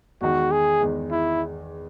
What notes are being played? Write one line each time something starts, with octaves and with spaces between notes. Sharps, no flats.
E2 D#3 G#3 F#4
G#4
E2 D#3 G#3
E4